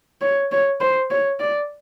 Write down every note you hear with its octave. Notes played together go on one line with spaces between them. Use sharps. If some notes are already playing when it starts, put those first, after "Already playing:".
C#5
C#5
C5
C#5
D5